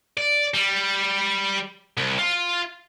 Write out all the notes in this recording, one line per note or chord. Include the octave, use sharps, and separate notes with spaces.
D5
G3
C2
F4